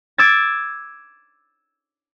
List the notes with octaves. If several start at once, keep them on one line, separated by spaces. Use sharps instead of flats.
D6 E6 G#6 A6